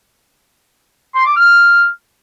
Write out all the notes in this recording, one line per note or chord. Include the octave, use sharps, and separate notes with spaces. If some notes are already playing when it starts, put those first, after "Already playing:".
C6
D6
F6